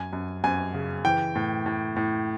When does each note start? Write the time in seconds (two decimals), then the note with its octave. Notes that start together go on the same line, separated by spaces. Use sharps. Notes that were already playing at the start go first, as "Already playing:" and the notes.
Already playing: F#2 G#5
0.13 F#2
0.44 F#2 G#5
0.74 C#3
1.04 E3 G5
1.35 A2
1.66 A2
1.96 A2